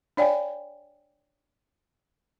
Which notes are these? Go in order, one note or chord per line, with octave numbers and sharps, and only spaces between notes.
D4 C#5 D5 F5 G5 G#5